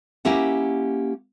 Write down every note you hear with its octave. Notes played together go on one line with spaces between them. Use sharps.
A#3 C#4 E4 G4 F#5